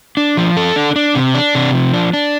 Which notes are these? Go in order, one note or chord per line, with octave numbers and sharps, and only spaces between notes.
D4
F3
A4
D4
D4
C3
D4
C3
F3
D4
D4